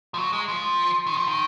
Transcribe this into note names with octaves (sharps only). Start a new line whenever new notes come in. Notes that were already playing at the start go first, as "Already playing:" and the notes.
F3
F#3
G#3
F3
D#3
F3
D#3